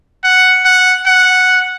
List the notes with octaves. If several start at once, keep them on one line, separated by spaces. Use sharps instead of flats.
F#5
F#5
F#5